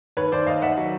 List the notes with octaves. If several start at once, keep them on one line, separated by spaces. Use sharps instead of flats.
D#2 B4 C#5
D#2 C5 D5
D#2 D#5 F5
D#2 E5 F#5
F#3